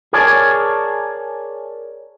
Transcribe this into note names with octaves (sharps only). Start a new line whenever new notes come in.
G#4 A#4 C#5 D5 G#5 A5